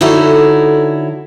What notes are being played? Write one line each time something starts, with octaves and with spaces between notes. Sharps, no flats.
D3 D#4 E4 F#4 A4 C#5